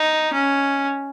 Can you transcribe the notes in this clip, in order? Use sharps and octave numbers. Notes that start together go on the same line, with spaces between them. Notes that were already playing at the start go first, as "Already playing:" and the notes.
Already playing: D#4
C#4